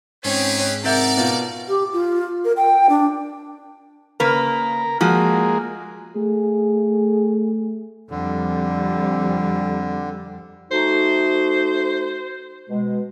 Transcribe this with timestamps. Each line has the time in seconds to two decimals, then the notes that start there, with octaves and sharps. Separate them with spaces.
0.24 G#2 C4 C#4 G4 G#4 B4
0.84 C3 A#4 D5 E5 F#5 G6
1.17 B2 F4
1.68 G4
1.93 F4
2.45 A#4
2.57 G5
2.89 D4
4.20 C#3 A#3 A#4 B4
5.01 F3 G#3 A#3 F#4
6.16 A3 G#4
8.10 F2 D3 G3
10.71 A3 D#4 F#4 C5
12.70 B2 G#3